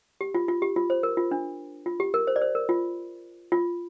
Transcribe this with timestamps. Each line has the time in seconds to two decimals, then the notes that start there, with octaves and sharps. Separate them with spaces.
0.21 G4
0.35 F4
0.48 F4
0.62 G4
0.76 F4
0.90 C5
1.03 A#4
1.17 F4
1.31 D4
1.86 F4
2.00 G4
2.14 A#4
2.27 C5
2.36 D5
2.42 C5
2.55 A#4
2.69 F4
3.52 F4